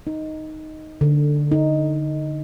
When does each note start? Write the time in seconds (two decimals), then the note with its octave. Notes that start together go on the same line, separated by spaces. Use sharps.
0.07 D#4
1.01 D3
1.52 D#4